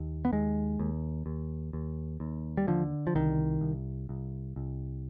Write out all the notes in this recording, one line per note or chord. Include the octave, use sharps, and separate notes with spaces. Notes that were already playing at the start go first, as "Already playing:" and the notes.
Already playing: D#2
B3
D#2 G#3
D#2
D#2
D#2
D#2
G3
D3 F3
F3
C2 D#3
C2
C2
C2